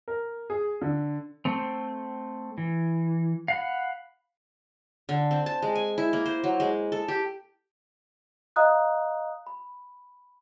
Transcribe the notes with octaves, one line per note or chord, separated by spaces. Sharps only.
A#4
G#4
D3
A3 C4
E3
F5 F#5 B5
D3
C4
A5
G#3
G#5
E4
A#3
C5
F#3
G#3
A4
G4
D#5 F5 A#5 D#6 F#6
B5